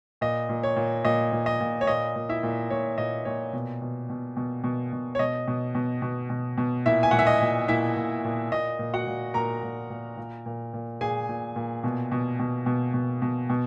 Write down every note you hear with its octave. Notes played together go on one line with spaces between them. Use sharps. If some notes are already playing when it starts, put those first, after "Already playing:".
A#2 D#5
A#2
C#5
A#2
A#2 D#5
A#2
D#5
A#2
C#5
A#2 D#5
A#2
E4 E5
A#2
A#2 C#5
A#2 D#5
A#2 C#5
B2
B2
B2
B2
B2
B2
C#5
B2 D#5
B2
B2
B2
B2
B2
A#2 E4 E5
G#5
A#2 F#5
E5
D#5
A#2
A#2 E4 E5
A#2
A#2
A#2 D#5
A#2
F#4 F#5
A#2
A#2 A#4 A#5
A#2
A#2
A#2
A#2
A#2
A#2 G#4 G#5
A#2
A#2
B2
B2
B2
B2
B2
B2
B2